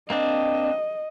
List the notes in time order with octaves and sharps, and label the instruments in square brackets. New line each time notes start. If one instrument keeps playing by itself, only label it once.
[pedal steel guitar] A#3 C4 D4 [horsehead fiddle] D#5